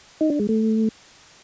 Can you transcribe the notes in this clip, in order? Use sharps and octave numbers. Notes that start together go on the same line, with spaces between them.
D#4
D4
G#3
A3